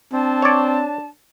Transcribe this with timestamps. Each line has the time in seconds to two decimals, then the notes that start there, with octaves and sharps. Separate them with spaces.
0.13 C4 D4 A5
0.42 C#5 D5